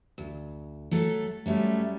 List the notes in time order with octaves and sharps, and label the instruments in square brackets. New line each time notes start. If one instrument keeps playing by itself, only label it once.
[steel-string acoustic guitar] D2
F#3 A3 A4
[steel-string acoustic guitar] F#3 G3 C#4 [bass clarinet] A3